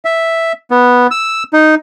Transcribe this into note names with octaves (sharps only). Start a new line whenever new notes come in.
E5
B3
E6
D#4